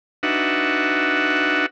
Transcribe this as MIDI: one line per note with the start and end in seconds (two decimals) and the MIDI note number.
0.23 1.66 62
0.23 1.66 63
0.23 1.66 66
0.23 1.66 71
0.23 1.66 76
0.23 1.66 78